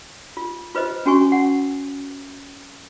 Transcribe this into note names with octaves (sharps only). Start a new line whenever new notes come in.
F4
F4 B4 C5 D#5
C#4 F#4 G#5 C#6
F#5